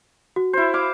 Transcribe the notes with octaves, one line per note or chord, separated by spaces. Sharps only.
F#4
E4 C5
F5 D6